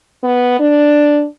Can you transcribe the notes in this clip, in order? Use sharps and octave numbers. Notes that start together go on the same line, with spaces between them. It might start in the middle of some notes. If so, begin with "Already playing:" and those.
B3
D4